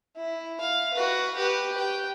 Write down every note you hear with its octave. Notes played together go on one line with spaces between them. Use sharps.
E4
F5
F#4 B4
G4 B4
G5